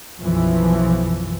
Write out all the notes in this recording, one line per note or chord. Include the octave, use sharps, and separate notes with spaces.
B1 F#2 E3 F3